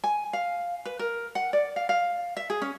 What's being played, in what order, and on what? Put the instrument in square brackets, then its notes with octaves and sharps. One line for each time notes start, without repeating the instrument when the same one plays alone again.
[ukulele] G#5
F5
B4
A#4
F#5
D5
F5
F5
E5
G#4
C#4